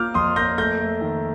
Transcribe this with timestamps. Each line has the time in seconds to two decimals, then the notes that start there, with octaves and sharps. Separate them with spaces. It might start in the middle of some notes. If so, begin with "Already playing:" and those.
Already playing: A#3 F4 D6 F6 G6
0.14 F2 C6 D#6
0.36 A#3 G6 A#6
0.58 A3 G6 A#6
0.80 A3
1.01 D#3